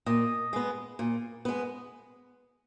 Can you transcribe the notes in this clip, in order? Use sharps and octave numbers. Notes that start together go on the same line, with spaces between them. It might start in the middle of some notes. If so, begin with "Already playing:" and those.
A#2 D#5
G#3 B3
A#2
G#3 B3